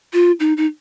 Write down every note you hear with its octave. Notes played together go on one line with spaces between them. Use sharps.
F4
D#4
D#4